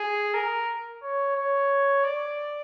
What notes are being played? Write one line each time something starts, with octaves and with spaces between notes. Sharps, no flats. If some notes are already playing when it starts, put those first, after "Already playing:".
Already playing: G#4
A#4
C#5
C#5
D5